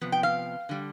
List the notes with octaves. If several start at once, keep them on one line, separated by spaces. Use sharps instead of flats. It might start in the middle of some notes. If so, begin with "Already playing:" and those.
C3 F3 B3
G5
F5
D3 G3